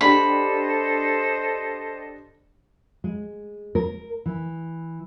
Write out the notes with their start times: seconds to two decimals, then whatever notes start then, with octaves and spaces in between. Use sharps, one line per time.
0.01 D4 G4 A4 C5 D#5 B5
3.04 G#3
3.75 A#4
4.26 E3